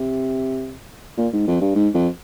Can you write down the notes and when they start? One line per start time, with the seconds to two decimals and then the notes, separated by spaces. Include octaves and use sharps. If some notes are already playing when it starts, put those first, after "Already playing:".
Already playing: C3
1.17 A#2
1.32 G#2
1.47 F2
1.61 G2
1.75 G#2
1.94 F2